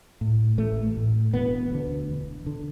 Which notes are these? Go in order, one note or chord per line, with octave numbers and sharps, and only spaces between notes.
A2
A1 A3
A2
E1 B3
D2 D3
E1
D3